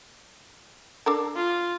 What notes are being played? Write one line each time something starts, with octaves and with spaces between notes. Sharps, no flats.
D4 A4 A#4
F4